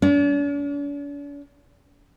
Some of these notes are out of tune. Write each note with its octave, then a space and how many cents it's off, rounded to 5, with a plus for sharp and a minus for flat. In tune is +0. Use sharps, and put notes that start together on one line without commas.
D4 -45